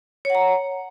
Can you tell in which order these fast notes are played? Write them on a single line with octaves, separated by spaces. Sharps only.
C#5 F#5 A#5